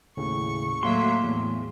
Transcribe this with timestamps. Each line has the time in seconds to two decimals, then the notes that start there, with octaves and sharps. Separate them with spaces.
0.17 D#2 A2 C#3 C#6
0.83 A2 F#3 A3 A#3 F#4 E5 C6
1.23 E2 A2